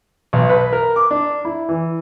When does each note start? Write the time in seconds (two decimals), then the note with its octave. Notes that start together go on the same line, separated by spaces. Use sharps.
0.33 B1
0.50 B4
0.73 A#4
0.96 D6
1.11 D4
1.45 E4
1.69 E3